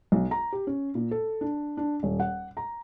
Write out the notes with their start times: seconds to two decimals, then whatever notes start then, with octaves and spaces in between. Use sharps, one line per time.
0.12 B1
0.31 A#5
0.52 G4
0.67 C#4
0.95 A#2
1.11 A4
1.41 D4
1.77 D4
2.03 D#1
2.20 F#5
2.57 A#5